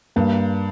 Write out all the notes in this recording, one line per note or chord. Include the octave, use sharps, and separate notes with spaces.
G2 A#3